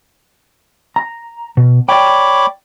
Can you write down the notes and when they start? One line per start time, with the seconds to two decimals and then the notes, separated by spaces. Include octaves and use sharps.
0.96 A#5
1.57 B2
1.89 C#5 D5 G5 B5 D6